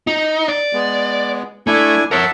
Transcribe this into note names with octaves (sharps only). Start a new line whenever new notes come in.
D#4
D5
G#3 B3
A3 D4 E4 G#5
A#4 C#5 E5 F#5 A5